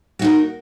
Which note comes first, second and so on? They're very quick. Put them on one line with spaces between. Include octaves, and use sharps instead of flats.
F#4 D#4 A#4